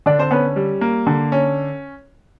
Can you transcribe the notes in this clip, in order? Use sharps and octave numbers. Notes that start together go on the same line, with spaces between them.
D3 D4 D5
C4 C5
B3 C#4 B4
G3
A#3
D3
C#4